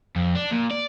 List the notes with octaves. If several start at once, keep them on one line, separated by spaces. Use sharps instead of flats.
F2
D4
A#2
D5